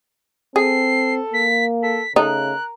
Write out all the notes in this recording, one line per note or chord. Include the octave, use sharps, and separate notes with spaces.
C4 G#4 A4 C7
A#3 B6
A4 B6
C#3 A3 D#4 A#4 F#6